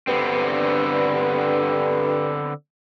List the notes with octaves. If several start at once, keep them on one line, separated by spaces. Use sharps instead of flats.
G2 D3 B3 C4